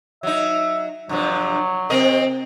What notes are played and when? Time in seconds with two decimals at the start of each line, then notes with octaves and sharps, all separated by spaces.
0.23 F#3 D#4 E5
1.09 G2 C3 F3 F#3
1.90 C3 C4 A#4 D#5